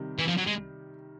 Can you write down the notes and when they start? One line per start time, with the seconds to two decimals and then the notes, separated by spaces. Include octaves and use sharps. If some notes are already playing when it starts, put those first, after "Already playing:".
Already playing: C3 D#3 G3
0.19 E3
0.28 F3
0.37 F#3
0.47 G#3